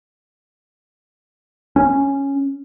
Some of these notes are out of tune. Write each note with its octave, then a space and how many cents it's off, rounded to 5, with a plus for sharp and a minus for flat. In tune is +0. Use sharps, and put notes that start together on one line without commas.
C#4 -5